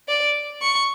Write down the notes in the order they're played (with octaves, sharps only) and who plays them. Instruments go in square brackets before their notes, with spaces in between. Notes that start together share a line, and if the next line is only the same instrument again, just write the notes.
[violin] D5
C#6